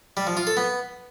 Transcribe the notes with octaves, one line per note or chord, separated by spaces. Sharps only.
G3
F3
F4
A4
B3